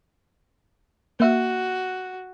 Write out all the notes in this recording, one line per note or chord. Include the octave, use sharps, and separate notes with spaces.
A#3 F#4 E5